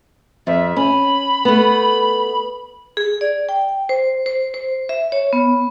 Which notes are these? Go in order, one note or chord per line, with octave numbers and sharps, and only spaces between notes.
F2 E5
C#4 B5
A3 B3
G#4
D5
G5
C5
C5
C5
E5
C#5
B3